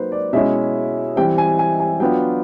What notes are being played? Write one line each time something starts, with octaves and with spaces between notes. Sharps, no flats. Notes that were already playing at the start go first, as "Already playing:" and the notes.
Already playing: F#3 A#3 D#4 B4 C5
D5
B2 G#3 C#4 E4 E5
E3 G3 C4 G5
G#5
G#5
G#5
F#3 B3 D4 F4 G5